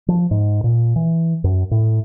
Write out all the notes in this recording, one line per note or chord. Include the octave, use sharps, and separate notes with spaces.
F3
G#2
A#2
E3
F#2
A2